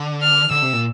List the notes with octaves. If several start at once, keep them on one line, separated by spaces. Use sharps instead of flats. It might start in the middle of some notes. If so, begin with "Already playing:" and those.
Already playing: D3
F6
D3 E6
C3
A#2